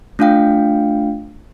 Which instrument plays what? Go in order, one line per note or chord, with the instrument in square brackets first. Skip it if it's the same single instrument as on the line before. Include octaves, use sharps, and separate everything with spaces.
[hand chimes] A3 D4 F4 F5 G5